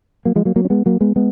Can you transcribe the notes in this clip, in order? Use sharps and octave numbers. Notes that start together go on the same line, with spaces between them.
F#3 A#3
F3 G#3
F#3 A#3
F#3 A#3
C#4
G#3 B3
F#3 A#3
G#3 B3
G#3 B3